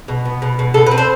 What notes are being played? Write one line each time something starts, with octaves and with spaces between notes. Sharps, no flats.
B2
B3
B2
B2
B2 A4
C4 B4
C5